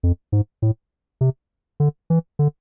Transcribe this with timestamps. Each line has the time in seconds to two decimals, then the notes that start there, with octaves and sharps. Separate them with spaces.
0.03 F2
0.32 G#2
0.62 A2
1.21 C3
1.80 D3
2.10 E3
2.39 D3